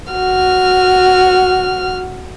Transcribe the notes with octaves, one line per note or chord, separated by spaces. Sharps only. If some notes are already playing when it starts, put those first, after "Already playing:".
F#4 F6